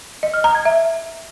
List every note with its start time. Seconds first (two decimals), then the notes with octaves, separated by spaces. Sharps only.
0.23 D#5
0.34 F6
0.44 A#5
0.55 G#6
0.65 E5